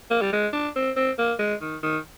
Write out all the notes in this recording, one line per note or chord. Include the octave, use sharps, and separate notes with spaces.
A#3
G3
G#3
D4
C4
C4
A#3
G#3
D#3
D#3